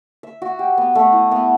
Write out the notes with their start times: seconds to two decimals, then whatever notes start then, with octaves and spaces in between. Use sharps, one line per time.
0.23 E5
0.42 F#4
0.59 G4
0.78 B3
0.95 A3
1.12 E4
1.32 B3